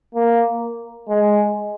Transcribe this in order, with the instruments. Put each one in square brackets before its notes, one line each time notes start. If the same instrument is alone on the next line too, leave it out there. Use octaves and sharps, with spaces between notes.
[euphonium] A#3
G#3